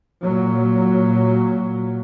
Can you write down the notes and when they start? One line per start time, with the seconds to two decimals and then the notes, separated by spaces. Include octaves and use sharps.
0.24 A#2 F#3